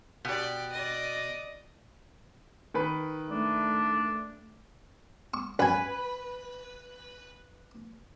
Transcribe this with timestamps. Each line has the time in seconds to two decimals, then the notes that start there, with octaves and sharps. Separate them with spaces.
0.25 B2 G4 D5
0.72 D5 D#5
2.74 D#3 B4
3.31 A3 D4
5.34 C#6
5.59 F#2 B4 G#5